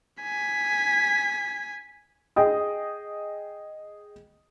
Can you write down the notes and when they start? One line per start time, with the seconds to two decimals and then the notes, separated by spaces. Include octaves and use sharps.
0.22 G#5 B6
2.36 G#4 D#5 G5 D#6